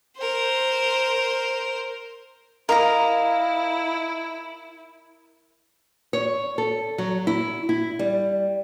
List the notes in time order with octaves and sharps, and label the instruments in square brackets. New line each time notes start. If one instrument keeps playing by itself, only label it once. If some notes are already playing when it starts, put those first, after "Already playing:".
[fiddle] A#4 C5
[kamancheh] E4 [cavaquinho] A#4 [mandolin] D#5 F5 A#5
[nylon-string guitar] C#5
A4
F#3
E4
E4
G3